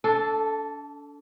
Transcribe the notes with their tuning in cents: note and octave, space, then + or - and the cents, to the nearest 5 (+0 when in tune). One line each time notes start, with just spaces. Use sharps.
D4 -35 A4 +0